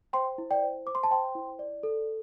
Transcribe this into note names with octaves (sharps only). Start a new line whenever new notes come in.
C5 G5 C6
E4
D5 G5
C5
C5 D6
C6
A5
C5 G5 C6
E4
D5
A4